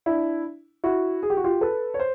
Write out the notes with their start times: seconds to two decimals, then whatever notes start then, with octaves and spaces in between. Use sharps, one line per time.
0.06 D4 E4
0.84 E4 F#4
1.23 G#4
1.30 G4
1.37 F#4
1.44 F4 G4
1.61 A4 B4
1.94 C#5
1.99 C5